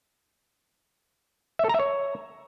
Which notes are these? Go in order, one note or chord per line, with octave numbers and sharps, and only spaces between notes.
E5
A4
A#5
E5
C#5